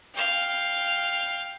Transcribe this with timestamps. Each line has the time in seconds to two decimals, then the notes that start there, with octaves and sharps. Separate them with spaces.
0.15 F5 G5